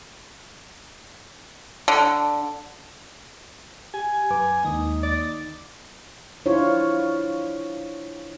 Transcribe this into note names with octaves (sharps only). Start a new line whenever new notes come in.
D3
G4 G#5
F#2 B4 D6
D#2 D#3 G#3 D#4 D#6
D5
D4 E4 F4 C5 C#5